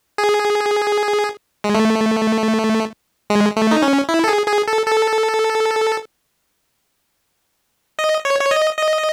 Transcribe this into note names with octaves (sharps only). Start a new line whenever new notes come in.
G#4
G#3
A3
G#3
A3
D#4
C#4
E4
A4
G#4
G#4
A4
A4
D#5
C#5
C#5
D#5
D#5